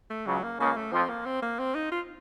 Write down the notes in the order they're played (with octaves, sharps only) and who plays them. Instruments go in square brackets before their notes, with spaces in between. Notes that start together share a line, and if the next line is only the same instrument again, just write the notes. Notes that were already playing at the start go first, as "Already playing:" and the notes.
[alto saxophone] A3
[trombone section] C#2 C#3 [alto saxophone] F#3
[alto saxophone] A#3
[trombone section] C#2 C#3 [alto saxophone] A#3
[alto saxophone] A3
[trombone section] F2 F3 [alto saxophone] C4
[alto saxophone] A#3
C4
A#3
C4
D#4
F4